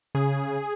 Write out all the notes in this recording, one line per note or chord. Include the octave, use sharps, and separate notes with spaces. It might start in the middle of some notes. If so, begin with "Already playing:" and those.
C#3 G#4